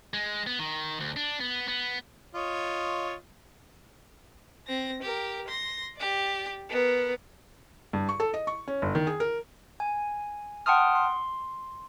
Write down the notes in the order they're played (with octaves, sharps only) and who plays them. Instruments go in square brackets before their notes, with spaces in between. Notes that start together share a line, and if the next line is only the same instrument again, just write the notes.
[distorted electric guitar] G#3
B3
D#3
D2
D4
B3
B3
[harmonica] F4 C#5 D#5
[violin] C4 A#6
G4 A#4
C6 A#6
G4 D5
B3 A#4
[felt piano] G2
C#6
A4
D#5
C#6
C#4
G1
D#3
G#4
A#4
[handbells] G#5
F#5 G5 A5 C6 D#6 F6
C6